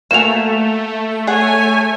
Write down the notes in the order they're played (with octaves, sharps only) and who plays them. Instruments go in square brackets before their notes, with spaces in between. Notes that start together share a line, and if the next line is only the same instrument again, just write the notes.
[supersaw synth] A3 [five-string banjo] A#3 F#4 G#5 [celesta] E7 F7
[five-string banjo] G#4 F#5 [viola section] C#5 G#5